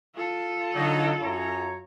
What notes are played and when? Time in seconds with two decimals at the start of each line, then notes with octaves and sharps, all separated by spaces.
0.15 F4 A4
0.75 D3 F#3 D#4
1.22 F#2 C#5 A#5